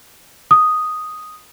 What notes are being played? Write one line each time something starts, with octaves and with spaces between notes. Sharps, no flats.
D#6